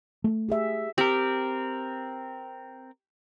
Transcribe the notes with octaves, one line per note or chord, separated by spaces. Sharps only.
A3
G4 G#4 E5
C4 G4 A#4